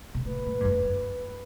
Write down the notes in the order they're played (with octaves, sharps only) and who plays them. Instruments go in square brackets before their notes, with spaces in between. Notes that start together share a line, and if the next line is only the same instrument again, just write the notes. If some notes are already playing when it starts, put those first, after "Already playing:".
[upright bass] B2
[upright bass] A2 [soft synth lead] B4
[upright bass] A2
G2
F#2
F#2